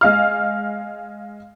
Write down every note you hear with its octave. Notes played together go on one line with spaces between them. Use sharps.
G#3 F5 F6